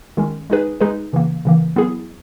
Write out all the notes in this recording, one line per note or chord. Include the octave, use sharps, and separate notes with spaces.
D#3 G#3 C#4
G#3 D#4 G#4 B4
G#3 D#4 G#4 B4
C#3 E3 A#3
C#3 E3 A#3
F#3 B3 E4 G#4